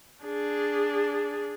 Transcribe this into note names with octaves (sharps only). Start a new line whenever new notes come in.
D4 G#4